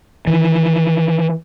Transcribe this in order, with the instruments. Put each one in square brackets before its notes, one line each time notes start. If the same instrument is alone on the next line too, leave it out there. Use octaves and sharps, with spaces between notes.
[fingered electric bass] D#3 E3